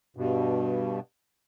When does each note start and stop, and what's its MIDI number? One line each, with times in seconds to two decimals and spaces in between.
0.17 1.00 43
0.17 1.00 47